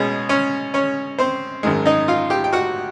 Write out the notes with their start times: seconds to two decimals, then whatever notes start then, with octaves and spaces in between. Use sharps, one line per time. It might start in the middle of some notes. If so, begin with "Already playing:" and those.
Already playing: B2 G#3 C#4
0.29 C#4 C#5
0.74 C#4 C#5
1.19 C4 C5
1.63 G#1 F#2 D#3 G#3
1.86 D#4 D#5
2.08 F4 F5
2.30 G4 G5
2.44 G5
2.53 F#4 F#5